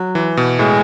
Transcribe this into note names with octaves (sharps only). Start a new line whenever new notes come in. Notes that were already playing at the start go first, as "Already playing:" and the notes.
Already playing: F#3
E3
B2
A2 G#3